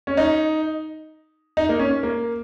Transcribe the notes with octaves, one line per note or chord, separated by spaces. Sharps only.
C#4
D#4
D#4
A#3
C#4
A#3